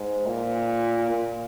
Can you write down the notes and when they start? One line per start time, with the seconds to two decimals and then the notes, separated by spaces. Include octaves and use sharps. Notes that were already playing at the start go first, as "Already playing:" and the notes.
Already playing: G#2
0.26 A#2
1.10 A#2